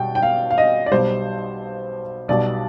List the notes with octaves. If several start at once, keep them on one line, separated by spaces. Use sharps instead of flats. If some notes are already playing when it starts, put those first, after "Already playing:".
Already playing: B2 G3 G5
G5
F5
F5
D#5
D5
B1 B2 G3 C5
B1 B2 G3 D5